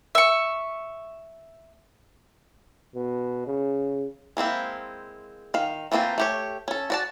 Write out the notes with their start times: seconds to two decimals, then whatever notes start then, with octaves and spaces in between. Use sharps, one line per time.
0.15 E5 C#6
2.95 B2
3.46 C#3
4.37 G#3 A#3 C4 E4
5.54 D#3 F5
5.92 E3 A3 A#3 C4 F4
6.18 A3 G4 C#5
6.68 C#4 A4
6.90 F#4 D5 A5